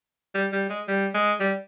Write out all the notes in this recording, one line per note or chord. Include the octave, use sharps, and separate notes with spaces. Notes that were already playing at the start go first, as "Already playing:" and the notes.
G3
G3
G#3
G3
G#3
G3